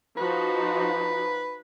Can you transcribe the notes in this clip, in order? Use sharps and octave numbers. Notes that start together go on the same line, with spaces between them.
F3 D#4 F#4 B4